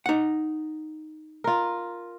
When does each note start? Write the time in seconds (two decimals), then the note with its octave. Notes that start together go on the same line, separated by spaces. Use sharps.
0.06 D#4 F#5
1.44 F4 A#4